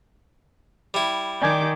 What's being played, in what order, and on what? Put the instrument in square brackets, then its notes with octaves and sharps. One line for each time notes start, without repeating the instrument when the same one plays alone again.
[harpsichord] G3 E4
[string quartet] D#3 [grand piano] D5 G#5 G#6 [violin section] G5 D6 G6